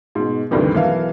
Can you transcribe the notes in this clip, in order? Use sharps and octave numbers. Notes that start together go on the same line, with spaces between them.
G#2 B2
D2 G2 C3 D#3 E3
B1 E3 E4 A#4 F5